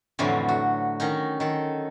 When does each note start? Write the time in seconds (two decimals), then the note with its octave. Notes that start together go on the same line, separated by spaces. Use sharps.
0.19 F2 A2 D3 E3 F#3
0.48 F#4
1.00 D#3 C#4 D#4
1.40 D#3 A4